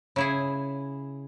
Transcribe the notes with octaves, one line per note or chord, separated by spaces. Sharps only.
C#3 E4 G#4